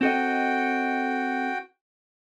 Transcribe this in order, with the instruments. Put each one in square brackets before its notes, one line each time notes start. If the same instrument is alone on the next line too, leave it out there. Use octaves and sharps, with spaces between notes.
[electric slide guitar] C4 A4 D#5 [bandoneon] F#4 G5